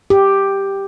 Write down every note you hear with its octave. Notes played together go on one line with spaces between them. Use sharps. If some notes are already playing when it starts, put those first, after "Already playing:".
G4